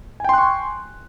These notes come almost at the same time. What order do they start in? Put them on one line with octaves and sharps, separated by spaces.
G#5 G5 C6 F#6 C#6